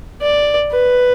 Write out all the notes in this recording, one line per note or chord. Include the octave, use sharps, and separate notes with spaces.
D5
B4